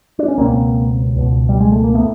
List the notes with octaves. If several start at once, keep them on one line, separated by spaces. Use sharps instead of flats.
D4
C#4
C#2 B2 A#3 C4
C#2 B2
G3
G#3
A3
A#3
A2 A3 B3